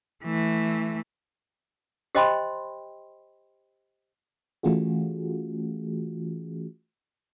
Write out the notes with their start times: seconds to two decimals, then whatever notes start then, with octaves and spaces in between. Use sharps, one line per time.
0.24 E3 A3
2.15 G4 C5 D#5 G5 B5 C6
4.63 E3 A3 C#4 F4 F#4 G#4